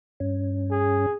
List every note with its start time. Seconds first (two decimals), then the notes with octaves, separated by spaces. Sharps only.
0.20 G2 C#4
0.71 G#4